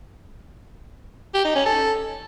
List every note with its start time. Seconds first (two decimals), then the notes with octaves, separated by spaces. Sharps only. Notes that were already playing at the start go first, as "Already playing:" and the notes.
1.34 G4
1.45 D#4
1.55 C#4
1.66 A4